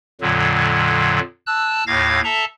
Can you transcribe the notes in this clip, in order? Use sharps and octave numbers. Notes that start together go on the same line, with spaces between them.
F2 A#2 D3 F#3
A5 E6 F#6
D#2 A2 F5 G#6 A#6
A4 E5 A5 A#5